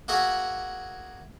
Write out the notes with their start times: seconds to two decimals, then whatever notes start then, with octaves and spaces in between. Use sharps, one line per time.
0.08 A#3 F#4 G#4 E5 F#5